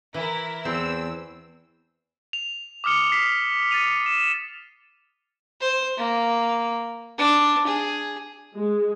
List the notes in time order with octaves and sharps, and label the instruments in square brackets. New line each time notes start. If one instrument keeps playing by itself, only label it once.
[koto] E3 [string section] E4 A#4
[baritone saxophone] E2 [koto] C4 [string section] E6
[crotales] F7
D6 D#6 F6 C#7 G7
B6 C7
A6 C#7 D#7 F7
E7
[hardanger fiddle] C5
A#3
D4
G#4
[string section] G#3